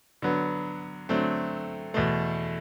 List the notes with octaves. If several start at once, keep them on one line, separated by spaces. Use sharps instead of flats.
D3 F#3 B3
D3 F#3 A3 C4
E2 B2 A3